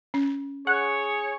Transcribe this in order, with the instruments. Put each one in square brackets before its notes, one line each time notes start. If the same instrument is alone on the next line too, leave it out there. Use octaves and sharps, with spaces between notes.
[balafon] C#4
[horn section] G#4 C#5 [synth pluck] F#5